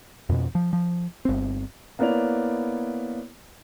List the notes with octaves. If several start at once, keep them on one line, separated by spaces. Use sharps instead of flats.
F2 B2
F3
F3
G1 C4
A#3 B3 E4 C#5 D5 F7